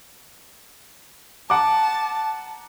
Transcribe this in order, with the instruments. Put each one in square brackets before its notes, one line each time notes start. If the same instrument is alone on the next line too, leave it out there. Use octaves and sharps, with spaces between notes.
[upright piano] F#5 A#5 D6 [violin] A5